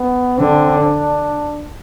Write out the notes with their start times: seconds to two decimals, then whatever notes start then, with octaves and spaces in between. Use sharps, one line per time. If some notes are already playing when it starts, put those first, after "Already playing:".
Already playing: B3
0.39 D3 C4
0.77 D4